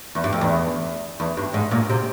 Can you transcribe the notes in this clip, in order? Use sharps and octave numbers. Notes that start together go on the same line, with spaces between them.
E2
G2
F2
E2
E2
G2
G#2
A#2
C3